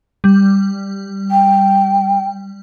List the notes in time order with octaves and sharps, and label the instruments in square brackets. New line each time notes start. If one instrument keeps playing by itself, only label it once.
[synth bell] G3
[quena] G5